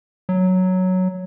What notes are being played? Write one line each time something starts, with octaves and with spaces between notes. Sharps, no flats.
F#3